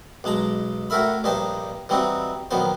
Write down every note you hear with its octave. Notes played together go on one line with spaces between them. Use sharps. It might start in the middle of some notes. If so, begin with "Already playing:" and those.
B1 G#3 A5 A#5
A2 F#4 A4 A#4 E5 B5
A#1 G2 D#4 G4 C5 A5
E3 G3 C4 D#4 F#4
A#1 D#3 F#3 B3 C5